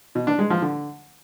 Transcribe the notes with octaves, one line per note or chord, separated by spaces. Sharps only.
B2
D4
G#3
F3
D3